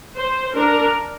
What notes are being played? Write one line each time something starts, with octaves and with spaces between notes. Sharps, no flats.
C5
D4 A#4